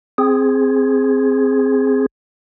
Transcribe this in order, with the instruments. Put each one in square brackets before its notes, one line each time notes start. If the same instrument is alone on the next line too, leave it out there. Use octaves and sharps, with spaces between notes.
[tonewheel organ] C4 G#4